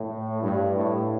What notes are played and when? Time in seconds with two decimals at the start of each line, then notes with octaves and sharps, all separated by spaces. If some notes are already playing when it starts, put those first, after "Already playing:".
Already playing: A2
0.41 G2
0.76 A2